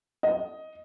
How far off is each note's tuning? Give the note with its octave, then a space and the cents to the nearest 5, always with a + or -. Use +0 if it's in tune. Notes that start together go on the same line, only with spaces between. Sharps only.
D#5 +10